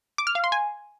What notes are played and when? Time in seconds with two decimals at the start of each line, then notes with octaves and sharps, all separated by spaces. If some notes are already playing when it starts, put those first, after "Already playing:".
0.18 D6
0.27 F6
0.35 F5
0.44 C6
0.52 G#5